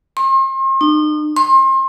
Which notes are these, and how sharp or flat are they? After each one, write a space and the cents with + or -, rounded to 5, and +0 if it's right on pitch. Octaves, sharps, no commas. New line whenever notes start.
C6 +40
D#4 -40
C6 +35